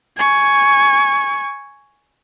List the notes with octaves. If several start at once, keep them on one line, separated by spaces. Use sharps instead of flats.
G#5 C#6